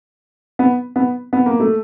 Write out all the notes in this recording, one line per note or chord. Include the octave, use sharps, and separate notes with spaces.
B3
B3
B3
A#3
A3